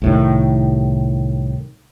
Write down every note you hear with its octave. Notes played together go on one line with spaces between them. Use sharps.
C2 A2 D#3